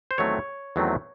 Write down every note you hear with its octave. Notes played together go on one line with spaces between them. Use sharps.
C5
E2 D#3 F#3 A3 C4 C#5
E2 D#3 F#3 A3 C4